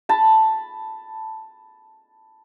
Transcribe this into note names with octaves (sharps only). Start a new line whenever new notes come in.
A5 B5